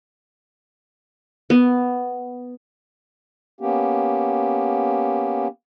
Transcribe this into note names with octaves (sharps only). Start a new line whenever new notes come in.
B3
A#3 B3 C#4 G4